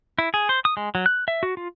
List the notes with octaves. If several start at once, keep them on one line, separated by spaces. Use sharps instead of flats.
E4
G#4
C5
D#6
G#3
F#3
F#6
E5
F#4
F4